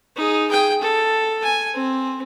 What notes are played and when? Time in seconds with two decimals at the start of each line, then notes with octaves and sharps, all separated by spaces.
0.16 D#4 G#4
0.50 G#4 G5
0.81 A4
1.43 G#5
1.74 C4